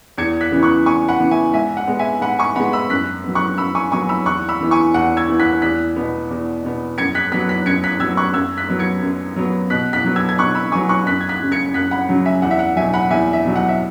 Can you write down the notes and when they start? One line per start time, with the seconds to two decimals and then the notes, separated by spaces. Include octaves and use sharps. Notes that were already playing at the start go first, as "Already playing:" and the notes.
0.18 E2 G#6 C#7
0.41 F#6 B6
0.51 C#3 E3 B3
0.63 C#6 F#6
0.85 E2 G#5 C#6
1.08 F#5 B5
1.20 C#3 E3 B3
1.31 E5 G#5
1.54 G#2 E5 G#5
1.77 F#5
1.87 G#3 B3
1.99 E5 G#5
2.22 G#2 F#5 B5
2.38 G#5 C#6
2.56 G#3 B3 F#5 B5
2.73 B5 E6
2.90 F#2 F#6 B6
3.24 F#3 B3
3.35 C#6 F#6
3.58 F#2 B5 E6
3.75 G#5 C#6
3.92 F#3 B3 G#5 C#6
4.09 B5 E6
4.26 E2 C#6 F#6
4.49 B5 E6
4.60 E3 B3
4.71 G#5 C#6
4.94 E2 F#5
5.17 E6 G#6
5.28 E3 B3
5.40 F#6 B6
5.62 E2 F#6 B6
5.96 B2 B3
6.30 E2
6.64 B2 B3
6.98 F#2 G#6 C#7
7.15 F#6 B6
7.32 F#3 B3 F#6 B6
7.49 F#6 B6
7.66 F#2 G#6 C#7
7.83 F#6 B6
8.00 F#3 B3 E6 G#6
8.17 C#6 F#6
8.34 F#2 E6 G#6
8.57 F#6 B6
8.69 F#3 B3
8.79 G#6 C#7
9.02 F#2
9.36 F#3 B3
9.70 B2 F#6 B6
9.93 F#6 B6
10.05 F#3 B3
10.16 E6 G#6
10.29 G#6
10.38 B2 C#6 F#6
10.55 B5 E6
10.72 F#3 B3 G#5 C#6
10.89 C#6 F#6
11.06 F#2 F#6 B6
11.21 G#6
11.29 F#6 B6
11.40 C#3 F#3
11.52 G#6 C#7
11.74 F#2 F#6 B6
11.91 F#5 B5
12.09 C#3 F#3
12.26 E5 G#5
12.42 E2 F#5
12.51 E5
12.59 F#5
12.76 B2 F#3 E5 G#5
12.93 F#5 B5
13.10 E2 E5 G#5
13.33 E5
13.45 B2 F#3
13.56 F#5
13.69 E5